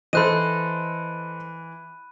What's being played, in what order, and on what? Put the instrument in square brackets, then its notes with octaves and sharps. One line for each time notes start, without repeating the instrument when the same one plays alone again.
[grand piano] E3 [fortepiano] A4 C5 D#5 [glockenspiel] B5 F#6 D#7